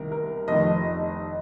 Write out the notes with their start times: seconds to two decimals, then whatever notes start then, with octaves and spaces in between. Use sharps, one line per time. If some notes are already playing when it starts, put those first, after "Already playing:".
Already playing: C2 C3 D#3 A#4
0.12 A#4
0.48 F1 F2 D#3 D#5